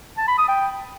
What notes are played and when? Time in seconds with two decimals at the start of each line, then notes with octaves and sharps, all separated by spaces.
0.17 A5
0.28 B5
0.38 D#6
0.48 G5